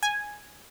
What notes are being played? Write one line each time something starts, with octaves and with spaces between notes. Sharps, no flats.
G#5